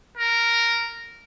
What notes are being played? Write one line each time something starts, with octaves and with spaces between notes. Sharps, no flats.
A#4